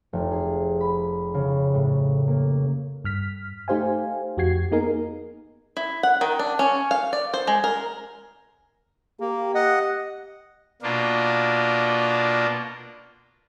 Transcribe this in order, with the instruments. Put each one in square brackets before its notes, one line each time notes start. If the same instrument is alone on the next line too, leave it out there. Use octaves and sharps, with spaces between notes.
[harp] F1
G#4
B5
C#3
A2
A#3
[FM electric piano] G2 F6 B6
A3 D#4 G4 C5 F5 G#5
F2 F#4 G4 G#6 C7
A#3 B3 D#4 G#4 A#4
[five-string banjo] E4
F#5
D#3
D4
C#4
F5
D5
C5
G#3
A#4
[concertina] A#3 [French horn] G4
[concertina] D#5 F#5
[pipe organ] B2 A#3 D4 F4